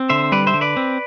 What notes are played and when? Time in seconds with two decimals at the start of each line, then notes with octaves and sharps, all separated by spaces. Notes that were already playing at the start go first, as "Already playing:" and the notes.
Already playing: C4
0.09 D3 C5 E5
0.32 G3 B4 D5
0.47 C5 E5
0.54 D3
0.61 B4 D5
0.77 C4